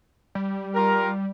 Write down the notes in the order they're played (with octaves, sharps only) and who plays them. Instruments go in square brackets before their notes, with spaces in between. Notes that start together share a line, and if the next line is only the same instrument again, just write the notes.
[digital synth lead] G3
[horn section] F4 G4 A#4